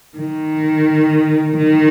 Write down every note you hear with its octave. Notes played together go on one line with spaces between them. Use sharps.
D#3
D#3